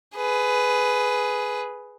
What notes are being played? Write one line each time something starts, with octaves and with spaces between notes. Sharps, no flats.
G#4 B4